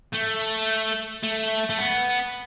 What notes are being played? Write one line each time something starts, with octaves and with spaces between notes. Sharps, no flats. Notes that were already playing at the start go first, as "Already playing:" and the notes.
A3
A3
A3
B3